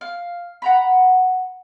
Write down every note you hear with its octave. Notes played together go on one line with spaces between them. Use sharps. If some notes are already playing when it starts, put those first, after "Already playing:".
F5
F#5 A#5 B5